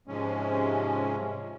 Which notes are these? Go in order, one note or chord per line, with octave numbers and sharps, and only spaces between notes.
G#2 C3 F3 G#3 C#4